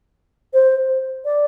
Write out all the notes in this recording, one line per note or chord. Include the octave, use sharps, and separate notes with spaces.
C5
D5